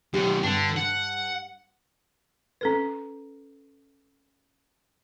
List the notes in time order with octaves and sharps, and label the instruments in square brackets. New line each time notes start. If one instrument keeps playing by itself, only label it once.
[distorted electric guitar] F#2 B2 [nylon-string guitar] D4 G4
[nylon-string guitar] G2 [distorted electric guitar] D3 D4
[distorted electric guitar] F#5
[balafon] C#4 A4 B4